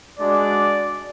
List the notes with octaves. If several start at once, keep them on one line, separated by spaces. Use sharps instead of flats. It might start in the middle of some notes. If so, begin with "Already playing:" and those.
G#3 D4 F#4 D5